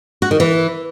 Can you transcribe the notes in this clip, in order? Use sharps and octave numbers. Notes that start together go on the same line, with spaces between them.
F#4
D#3
E3